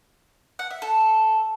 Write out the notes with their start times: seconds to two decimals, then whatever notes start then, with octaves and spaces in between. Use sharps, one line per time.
0.59 F#5
0.71 E5
0.82 A4